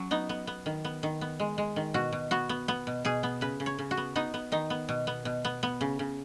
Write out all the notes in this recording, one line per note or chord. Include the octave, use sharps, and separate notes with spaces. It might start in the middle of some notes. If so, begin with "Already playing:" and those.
Already playing: F#3 C#4
B3 D#4
B3
B3
D#3
B3
D#3
B3
G#3
G#3
D#3
B2 F#4
B2
B3 F#4
B3
B3
B2
B2 G#4
B3
C#3 B4
C#3
C#5
C#3
F#4
B3
B3 D#4
B3
D#3 D#4
B3
B2
B3
B2
B3
B3
C#3
C#3